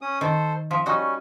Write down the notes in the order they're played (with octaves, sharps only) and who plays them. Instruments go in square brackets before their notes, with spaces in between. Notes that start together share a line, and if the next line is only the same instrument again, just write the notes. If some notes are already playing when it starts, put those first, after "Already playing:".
[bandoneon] C#4 D#6
[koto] D#3 [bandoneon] A4 C5
[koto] F3 [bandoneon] E5
[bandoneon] G3 C#4 [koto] D#4 F#4